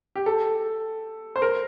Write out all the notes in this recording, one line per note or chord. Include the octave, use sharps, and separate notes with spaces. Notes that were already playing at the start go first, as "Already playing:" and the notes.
G4
A4
C5
A#4